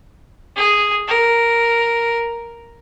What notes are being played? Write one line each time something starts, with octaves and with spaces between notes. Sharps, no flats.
G#4
A#4